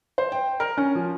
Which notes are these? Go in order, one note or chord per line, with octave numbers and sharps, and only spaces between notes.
C5
G5
A#4
C#4
F3